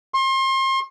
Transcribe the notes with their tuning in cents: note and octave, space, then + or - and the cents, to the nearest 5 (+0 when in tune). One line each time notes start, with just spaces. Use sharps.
C6 +35